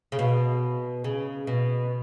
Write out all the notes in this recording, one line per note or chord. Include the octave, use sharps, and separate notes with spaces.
C#3
B2
C#3
B2